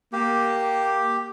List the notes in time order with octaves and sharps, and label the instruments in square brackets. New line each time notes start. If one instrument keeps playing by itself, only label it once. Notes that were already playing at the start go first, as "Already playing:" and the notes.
[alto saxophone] A#3 [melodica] G4